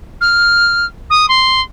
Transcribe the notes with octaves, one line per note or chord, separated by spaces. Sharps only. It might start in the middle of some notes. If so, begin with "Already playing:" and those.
F6
D#6
C6